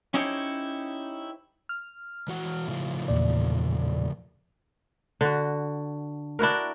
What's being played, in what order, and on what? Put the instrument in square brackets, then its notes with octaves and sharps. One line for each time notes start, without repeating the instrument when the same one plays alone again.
[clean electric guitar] C#4 D#4 E4 G4 C5 C#5
[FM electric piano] F6
[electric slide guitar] E3 F#4 F#5
A2 C#3 F3
[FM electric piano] E2 A#2 D5
[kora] D3 F#4
D4 E4 F#4 A#4